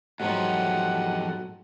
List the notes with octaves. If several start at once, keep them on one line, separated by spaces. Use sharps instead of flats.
E2 G#2 F3 F#3 G4 A4 D#5 F#5